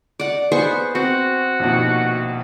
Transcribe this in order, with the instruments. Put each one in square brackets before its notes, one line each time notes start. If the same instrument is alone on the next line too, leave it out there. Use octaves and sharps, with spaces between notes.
[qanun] D5 F#5
[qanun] B3 C5 C#6 [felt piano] G#4
[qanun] C4 [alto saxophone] F#4
[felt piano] A#1 D#2 B2